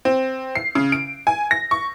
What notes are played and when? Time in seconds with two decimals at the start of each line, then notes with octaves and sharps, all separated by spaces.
0.05 C4
0.55 C7
0.75 C#3
0.92 D7
1.27 G#5
1.51 A#6
1.71 C#6